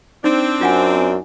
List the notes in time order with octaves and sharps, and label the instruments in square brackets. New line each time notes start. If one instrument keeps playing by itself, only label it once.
[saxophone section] C4 D4 [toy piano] D#4
[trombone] F#2 [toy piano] F4 F#5 G#5